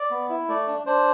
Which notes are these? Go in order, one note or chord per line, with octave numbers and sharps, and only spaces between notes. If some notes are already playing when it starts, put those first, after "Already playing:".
Already playing: D5
B3
E4
A3 D5
D4
D4 C5